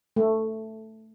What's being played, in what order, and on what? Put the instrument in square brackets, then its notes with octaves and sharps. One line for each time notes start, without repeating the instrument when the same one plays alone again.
[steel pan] A3